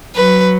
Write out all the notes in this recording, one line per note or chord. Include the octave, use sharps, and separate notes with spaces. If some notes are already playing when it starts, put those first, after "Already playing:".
F#3 B4